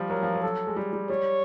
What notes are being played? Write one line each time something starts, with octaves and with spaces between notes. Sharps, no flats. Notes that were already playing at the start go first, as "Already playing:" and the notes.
Already playing: F3 G3
F#3 A#4
F3
F#3
A4
G#3
G3
G3
G3 C#5